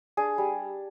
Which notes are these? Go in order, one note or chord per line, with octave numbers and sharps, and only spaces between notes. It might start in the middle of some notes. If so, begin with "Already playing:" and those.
D4 G#4
G3